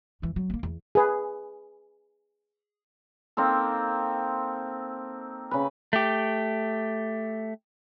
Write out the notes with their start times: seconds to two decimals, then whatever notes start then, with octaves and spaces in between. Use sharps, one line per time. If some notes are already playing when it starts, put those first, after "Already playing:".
0.22 F2 E3
0.36 F#3 G3
0.50 A#3 B3
0.63 E2
0.95 G#4 B4
3.37 A#3 C4 D#4 A4
5.51 C#3 B4
5.93 A3 G4